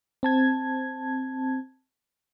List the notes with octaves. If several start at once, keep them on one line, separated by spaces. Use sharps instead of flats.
C4 A5 G#6